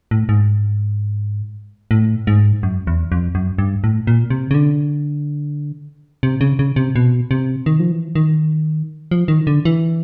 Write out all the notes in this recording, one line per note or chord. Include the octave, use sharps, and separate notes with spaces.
A2
G#2
A2
G#2
F#2
E2
F2
F#2
G2
A2
A#2
C3
C#3
D3
C3
C#3
C#3
C3
B2
C3
D#3
F3
E3
D#3
F3
D#3
D3
E3